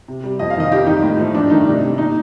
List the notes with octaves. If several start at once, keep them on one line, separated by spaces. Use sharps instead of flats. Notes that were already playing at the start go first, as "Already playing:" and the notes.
C3
G3
F2 D#5
F5
C3 D#3 D#5
F2 G4
D#3 G3 D#4
A2
F3 A3
G2 D4
D#3 A3 D#4
C3 D4
G3
A#2 D#4